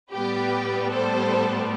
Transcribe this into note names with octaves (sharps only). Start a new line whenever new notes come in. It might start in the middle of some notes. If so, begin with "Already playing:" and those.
A2 G3 B3 G4 B4
A4 C5